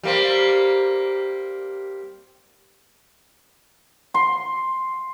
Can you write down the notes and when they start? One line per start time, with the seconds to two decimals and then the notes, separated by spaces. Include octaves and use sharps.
0.03 G3 A#3 C4
4.14 C6